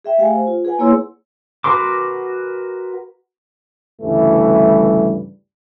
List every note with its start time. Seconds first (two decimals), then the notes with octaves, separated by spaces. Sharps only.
0.04 G#4 E5 G5
0.18 A3 G4 F5 F#5 G#5
0.33 C5
0.47 F4
0.65 G#4 B4 D5 F#5 G#5
0.79 A#3 E4 G#4 C#5 C6 E6
1.64 F#4 A#4 B4 C6 D6
4.02 D2 G2 C#3 E3 G3 A3